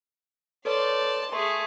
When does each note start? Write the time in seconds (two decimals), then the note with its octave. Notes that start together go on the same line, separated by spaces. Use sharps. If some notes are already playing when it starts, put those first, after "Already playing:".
0.65 A4 B4 C#5 D5 A5 C6
1.32 A3 G#4 A5 C6 C#6